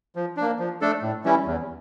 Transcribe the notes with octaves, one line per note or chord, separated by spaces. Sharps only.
F3
A#3 D4
F3
A3 D4 A4
A2
E3 G3 C#4 E4
E2